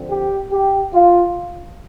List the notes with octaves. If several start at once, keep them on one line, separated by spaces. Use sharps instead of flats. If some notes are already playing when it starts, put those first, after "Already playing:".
Already playing: D3 F3 C4
G4
G4
F4